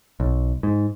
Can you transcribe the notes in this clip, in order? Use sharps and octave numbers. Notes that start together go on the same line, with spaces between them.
B1
G#2